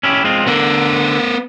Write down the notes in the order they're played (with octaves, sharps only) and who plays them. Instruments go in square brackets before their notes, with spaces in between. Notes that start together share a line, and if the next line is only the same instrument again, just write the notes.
[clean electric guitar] C#4 E4 G4
G#3 C4 F4
[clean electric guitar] D3 [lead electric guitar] B3 A#4